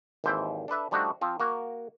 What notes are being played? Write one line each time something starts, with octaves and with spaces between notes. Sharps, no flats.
G#1 D#2 E3 C5 E5 G5
D4 A4 B4 E5
F3 G3 A3 D4 D#4 F#4
F3 C4 F4
A#3 F#4 A#4